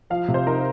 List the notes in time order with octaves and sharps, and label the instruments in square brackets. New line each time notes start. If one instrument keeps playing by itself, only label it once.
[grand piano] F3 [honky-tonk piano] F5
[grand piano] C3
[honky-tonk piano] C5
[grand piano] D#4 [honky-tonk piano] A#4